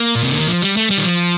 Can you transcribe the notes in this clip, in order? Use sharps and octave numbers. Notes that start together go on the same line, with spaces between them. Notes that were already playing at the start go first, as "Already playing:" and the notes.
Already playing: A#3
A#2
C3
D3
D#3
F3
G3
A3
G3
D#3
F3